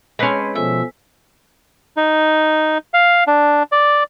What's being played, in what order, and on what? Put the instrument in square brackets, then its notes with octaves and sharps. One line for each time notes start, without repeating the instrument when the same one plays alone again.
[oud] G#3 C#4 [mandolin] C4 B4 C6 [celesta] B5 G#6
[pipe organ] B2 F3 [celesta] A4 C5 G#5 [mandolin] E5
[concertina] D#4
F5
D4
D5